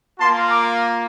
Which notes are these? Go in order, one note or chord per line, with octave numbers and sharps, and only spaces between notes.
A#3 F4 A5 C6
A#5 D6